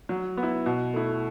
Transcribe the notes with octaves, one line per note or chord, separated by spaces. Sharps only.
F#3
B3
E4
B2
A3 E4